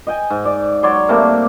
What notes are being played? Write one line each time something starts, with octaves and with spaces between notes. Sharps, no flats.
D#5 G5 G#5
G#2
D5
F#3 C#5 D5 C6
C3 G3 A3 A#3